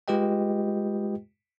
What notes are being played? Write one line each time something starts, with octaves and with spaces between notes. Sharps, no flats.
G#3 F4 G4 B4 D#5 G5